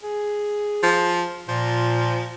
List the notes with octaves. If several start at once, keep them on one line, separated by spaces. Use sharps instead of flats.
G#4
F3
A#2 F3